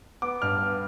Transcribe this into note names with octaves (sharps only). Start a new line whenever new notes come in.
B3 D6
G2 F6
B3